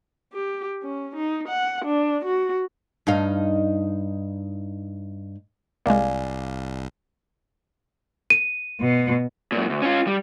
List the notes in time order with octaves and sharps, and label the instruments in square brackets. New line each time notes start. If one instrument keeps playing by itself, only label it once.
[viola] G4
C#4
D#4
F#5
D4
F#4
[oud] G2 D#4 F5
[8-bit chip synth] C2 [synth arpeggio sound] G#3 A#3 [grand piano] D5 F5 G#5
[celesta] D#7
[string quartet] B2
[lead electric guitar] F#2 A#2
D2
C#4 F4
G3